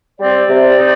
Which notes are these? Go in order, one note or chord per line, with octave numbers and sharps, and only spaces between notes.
G3 C4 D5
C3
C4 D#4